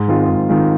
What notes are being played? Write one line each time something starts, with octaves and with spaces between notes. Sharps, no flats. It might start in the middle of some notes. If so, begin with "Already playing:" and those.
Already playing: G#2
D#3 G#3 C4 F4
G#2
D#3 G#3 C4 F4